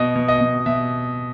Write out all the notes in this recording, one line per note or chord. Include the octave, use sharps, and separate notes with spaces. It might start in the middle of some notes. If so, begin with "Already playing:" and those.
Already playing: B2 D#5
B2
D#5
B2
B2 E5